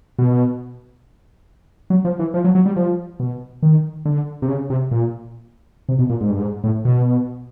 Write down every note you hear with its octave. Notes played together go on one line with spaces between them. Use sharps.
B2
F#3
F3
E3
F3
F#3
F#3
G3
F3
B2
D#3
D3
C3
C#3
C3
A#2
C3
B2
A#2
G#2
G2
G#2
A2
B2